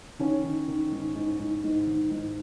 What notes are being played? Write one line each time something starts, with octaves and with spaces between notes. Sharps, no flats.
D#3 C#4
D#3
D#3
G#2
G#2
G#2
G#2
D#3
G#2